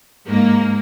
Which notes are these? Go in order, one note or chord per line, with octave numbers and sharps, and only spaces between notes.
G#2 A#3